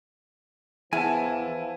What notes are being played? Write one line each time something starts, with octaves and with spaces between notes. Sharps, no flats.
E2 E3 F3 E4 G#5 A5